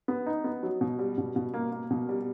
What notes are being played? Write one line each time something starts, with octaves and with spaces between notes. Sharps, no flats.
B3
D#4
B3
F#3
B2
G3
B2
B2
A#3
A#3
B2
G3